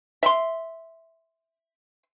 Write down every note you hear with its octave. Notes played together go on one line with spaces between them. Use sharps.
E5 B5 C6